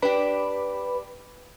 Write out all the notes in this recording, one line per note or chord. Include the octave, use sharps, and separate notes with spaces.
D4 G4 B4 B5